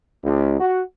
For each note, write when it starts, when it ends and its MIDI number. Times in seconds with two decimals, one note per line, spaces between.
0.24 0.60 37
0.60 0.82 66